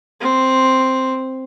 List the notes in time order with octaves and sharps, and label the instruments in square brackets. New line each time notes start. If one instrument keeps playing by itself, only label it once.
[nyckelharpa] C4